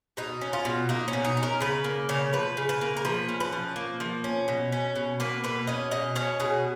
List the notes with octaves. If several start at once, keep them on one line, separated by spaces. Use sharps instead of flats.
B2 D#4
C#4
F4
B2
A#3 D#4
C#4
B2
D#4
C#4
A#4
C#3 B4
A#3
C#3 C#5
F3 B4
C#3
B4
A#3
A#4
F3 B4
C#4
B4
F3
A#3
F3
C#4
B2
C#4
B2
A#3 B4
B2 B4
C#4 D#5
B2 D#5
C#4 C#5
B2 G#4